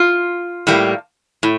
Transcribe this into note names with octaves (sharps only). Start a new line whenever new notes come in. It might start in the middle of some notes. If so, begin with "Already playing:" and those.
Already playing: F4
A2 G3 A#3
A2